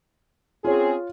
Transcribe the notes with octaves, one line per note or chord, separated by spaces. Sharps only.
C4 C#4 F4 G#4 C#5